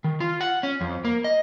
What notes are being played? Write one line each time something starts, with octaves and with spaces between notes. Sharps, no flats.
D#3
F4
F#5
C#4
F2
A#3
D#5